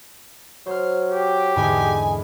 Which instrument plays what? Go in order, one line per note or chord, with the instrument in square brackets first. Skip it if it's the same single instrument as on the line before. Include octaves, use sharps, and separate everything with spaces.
[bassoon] F#3 [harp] C5 F6
[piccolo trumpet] G4
[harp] E2 G#2 D3 [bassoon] G#3 [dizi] G#5